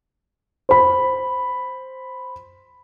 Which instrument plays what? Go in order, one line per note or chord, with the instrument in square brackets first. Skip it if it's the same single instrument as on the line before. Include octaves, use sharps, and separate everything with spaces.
[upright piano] C5 B5